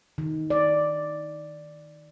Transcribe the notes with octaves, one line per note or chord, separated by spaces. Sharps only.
D#3
D5